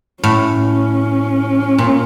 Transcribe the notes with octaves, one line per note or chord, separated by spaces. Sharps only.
A2 C#4
A#2